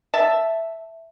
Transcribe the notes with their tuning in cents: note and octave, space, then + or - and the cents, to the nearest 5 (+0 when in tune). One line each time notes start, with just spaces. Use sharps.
E5 +0 A5 +0